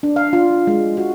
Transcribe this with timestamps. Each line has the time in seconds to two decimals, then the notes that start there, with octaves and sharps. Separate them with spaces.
0.03 D4
0.16 F5
0.33 F4
0.67 G#3
0.97 F#4